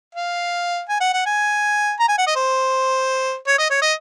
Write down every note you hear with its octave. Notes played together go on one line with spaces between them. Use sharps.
F5
G#5
F#5
F#5
G#5
A#5
G#5
F#5
D#5
C5
C#5
D#5
C#5
D#5